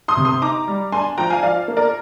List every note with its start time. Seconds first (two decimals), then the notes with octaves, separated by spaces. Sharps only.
0.08 C6 D#6
0.17 C3
0.25 C6 D#6
0.42 D#4 A#5 D6
0.67 G3
0.92 D4 G#5 C6
1.18 F3 G5 A#5
1.30 F5 G#5
1.43 F3 D5 F5
1.68 A#3
1.77 A#4 D5